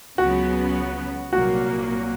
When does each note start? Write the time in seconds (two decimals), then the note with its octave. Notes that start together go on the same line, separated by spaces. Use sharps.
0.18 C#2 C#3 F#3 B3 F#4
1.33 C2 A#2 F#3 A#3 F#4